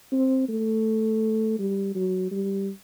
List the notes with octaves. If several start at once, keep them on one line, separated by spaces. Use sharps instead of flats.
C4
A3
G3
F#3
G3